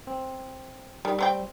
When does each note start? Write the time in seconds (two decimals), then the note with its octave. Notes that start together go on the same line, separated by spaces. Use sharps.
0.07 C4
1.05 D#3 G3
1.19 A3 C4 G5